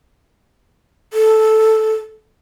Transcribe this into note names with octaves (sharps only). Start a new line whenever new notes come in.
A4